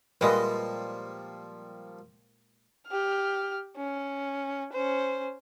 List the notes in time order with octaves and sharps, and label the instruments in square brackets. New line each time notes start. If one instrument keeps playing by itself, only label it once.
[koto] A#2 G#3 [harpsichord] F3 G3 A#3 [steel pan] B4 D#5 E5
[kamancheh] G4 F6
C#4
C#4 C5